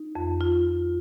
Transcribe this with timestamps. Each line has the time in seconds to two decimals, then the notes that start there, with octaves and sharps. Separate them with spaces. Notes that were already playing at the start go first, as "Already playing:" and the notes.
Already playing: D#4
0.15 F2
0.41 F4